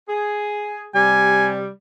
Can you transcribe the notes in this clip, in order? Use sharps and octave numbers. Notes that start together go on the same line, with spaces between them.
G#4
C3 G3 G#5